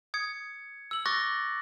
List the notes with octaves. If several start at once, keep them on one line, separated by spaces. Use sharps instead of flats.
D#6 G#6 C#7
E6 F#7
C#6 D6 F#6 A6 A#6